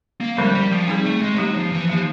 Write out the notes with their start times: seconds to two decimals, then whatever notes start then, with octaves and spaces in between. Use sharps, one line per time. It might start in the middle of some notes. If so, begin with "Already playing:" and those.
0.21 A#3
0.38 D3 F3 G3 G#3 C#4
0.55 G3
0.71 F3
0.88 G3 C4 D#4 G#4
1.06 A3
1.21 G#3
1.34 F3
1.38 F#3 A#3 D#4 G4
1.56 F3
1.72 E3
1.89 F3 A#3 D#4 G4